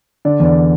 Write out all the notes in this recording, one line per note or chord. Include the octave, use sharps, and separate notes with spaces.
D3 D5
E2 D5